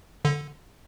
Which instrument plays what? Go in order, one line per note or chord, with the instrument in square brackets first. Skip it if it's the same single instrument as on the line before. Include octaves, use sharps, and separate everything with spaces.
[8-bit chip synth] D3